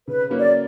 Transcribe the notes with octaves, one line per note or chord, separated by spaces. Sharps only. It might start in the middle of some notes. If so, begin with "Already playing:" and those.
C#3 B4
F#3 A#3 C#4
D5